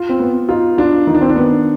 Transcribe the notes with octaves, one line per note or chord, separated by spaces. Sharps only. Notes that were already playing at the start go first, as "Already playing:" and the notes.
Already playing: F4
C4
B3
D#4 F4
D4 F4
D#3 D#4
D4
C4
D4
B3